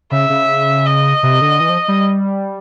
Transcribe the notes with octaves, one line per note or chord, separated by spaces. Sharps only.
C#3 E5
C#3
D#5
C3
D3
E3
F3
G3